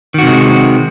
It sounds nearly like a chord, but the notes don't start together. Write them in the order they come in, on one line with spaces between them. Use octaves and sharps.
D#3 F#4 C3 G#3